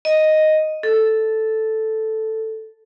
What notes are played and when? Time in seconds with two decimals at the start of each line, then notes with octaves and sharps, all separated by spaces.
0.05 D#5
0.83 A4